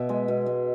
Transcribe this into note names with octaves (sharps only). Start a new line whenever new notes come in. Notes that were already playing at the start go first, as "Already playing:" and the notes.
Already playing: B2 E5
G#3
B2
G#3